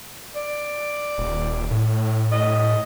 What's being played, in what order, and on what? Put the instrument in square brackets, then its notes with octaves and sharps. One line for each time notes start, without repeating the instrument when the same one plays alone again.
[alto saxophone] D5
[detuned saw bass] D#1
A2
[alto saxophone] D#5